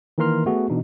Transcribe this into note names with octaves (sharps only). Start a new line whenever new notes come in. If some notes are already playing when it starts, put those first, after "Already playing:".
D#3 E3 A#3 A#4 C6 F6
A3 B3 F#4 G#4
B2 E3 D4 D#4